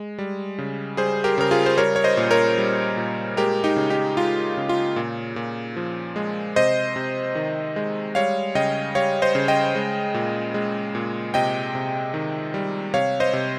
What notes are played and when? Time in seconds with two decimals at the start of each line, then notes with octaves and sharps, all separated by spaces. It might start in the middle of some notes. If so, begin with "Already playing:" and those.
Already playing: G#3
0.18 G3
0.58 C#3
0.97 G3 G#4 C5
1.24 G4 A#4
1.38 C#3 A#4
1.51 F4 G#4
1.66 C5
1.78 G3 A#4 C#5
1.96 C#5
2.04 C5 D#5
2.17 A#2
2.31 A#4 C#5
2.58 G3
2.97 A#2
3.37 G#3 G4 A#4
3.64 D#4 G4
3.76 C#3
3.90 D#4 G4
4.17 G#3 F4
4.57 C#3
4.69 F4
4.96 A#2
5.36 A#2
5.76 F3
6.16 G#3
6.56 C3 C5 D#5
6.96 C3
7.35 D#3
7.76 G#3
8.15 G3 C#5 F5
8.55 C#3 D#5 G5
8.95 G3 C#5 F5
9.22 C5 D#5
9.35 C#3
9.48 D#5 G5
9.75 G#3
10.14 A#2
10.54 G#3
10.95 A#2
11.34 C3 D#5 G5
11.75 C3
12.14 D#3
12.54 G3
12.94 C3 C#5 F5
13.20 C5 D#5
13.33 C3